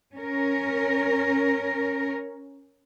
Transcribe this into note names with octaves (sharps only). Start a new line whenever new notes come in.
C#4 A#4